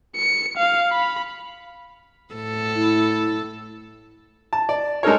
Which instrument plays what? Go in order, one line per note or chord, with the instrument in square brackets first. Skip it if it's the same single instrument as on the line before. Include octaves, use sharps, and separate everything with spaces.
[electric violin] C#7
F5
B5
[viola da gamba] A2 A4
[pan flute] E4
[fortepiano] A5
D5
G#3 D#4 A4 A#4 C#5